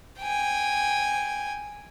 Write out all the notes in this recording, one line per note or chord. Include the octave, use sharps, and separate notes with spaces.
G5 G#5